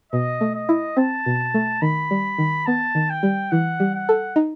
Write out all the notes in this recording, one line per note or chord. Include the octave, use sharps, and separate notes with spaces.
B2 D#5
A3
D#5
E4
C4 A5
B2
A3
D#3 B5
G3
D#3
B3 A5
D#3
G5
G3
E3 F#5
G3
F#5
A4
D#4